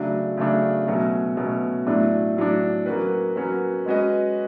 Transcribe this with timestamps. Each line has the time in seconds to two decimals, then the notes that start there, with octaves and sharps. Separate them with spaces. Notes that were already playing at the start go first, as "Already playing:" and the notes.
Already playing: C#3 F#3 A3 D4
0.37 C#3 F#3 A3 D4
0.87 B2 F#3 A3 C#4
1.37 B2 F#3 A3 C#4
1.87 A2 F#3 A3 D4
2.37 A2 F#3 A3 D4
2.86 F#3 A#3 C#4 F#4 B4
3.36 F#3 A#3 C#4 F#4 B4
3.86 G#3 C#4 F#4 B4 D#5